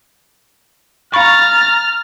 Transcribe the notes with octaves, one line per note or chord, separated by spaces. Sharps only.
F5 A#5 B5 C#6 F6 A6